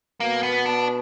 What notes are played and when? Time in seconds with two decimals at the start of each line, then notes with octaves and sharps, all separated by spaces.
0.20 B2 A#3
0.43 B3
0.66 D4